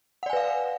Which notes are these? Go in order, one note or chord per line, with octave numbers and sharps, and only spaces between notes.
B4 D5 F5 F#5 G#5